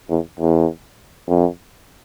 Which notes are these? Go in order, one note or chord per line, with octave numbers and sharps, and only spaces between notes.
E2
E2
F2